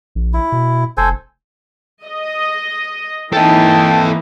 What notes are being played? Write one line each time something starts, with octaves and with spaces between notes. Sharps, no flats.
A#1
E4
B2
F1 A4 C5 G#5
D#5
E3 A#3 D#4 A4 D#5 G5 A5